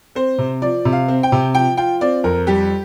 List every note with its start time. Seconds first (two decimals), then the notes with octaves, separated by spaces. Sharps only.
0.15 C4 C5
0.38 C3
0.62 F3 D5
0.85 C3
0.93 F5
1.08 C4
1.23 G5
1.32 C3
1.55 F3 G5
1.77 F4 G5
2.01 C4 D5
2.24 F2 A#4
2.47 G3 G4